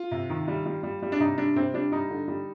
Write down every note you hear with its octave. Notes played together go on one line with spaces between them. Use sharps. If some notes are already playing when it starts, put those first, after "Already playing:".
Already playing: F4
C3
D#3
G3
G3
G3
G3
D4
C3 D#4
G3 D4
C3 C4
G3 D4
G3 D#4
D3
G3